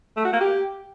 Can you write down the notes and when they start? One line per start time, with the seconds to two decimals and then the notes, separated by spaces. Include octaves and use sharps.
0.17 A3
0.25 F#4
0.33 A#3
0.41 G4